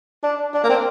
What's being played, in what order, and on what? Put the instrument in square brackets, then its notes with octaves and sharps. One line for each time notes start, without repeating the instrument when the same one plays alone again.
[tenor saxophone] D4
D4
A#3
C4